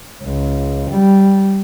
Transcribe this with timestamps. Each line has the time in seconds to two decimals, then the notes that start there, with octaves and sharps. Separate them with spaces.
0.24 C#2
0.91 G3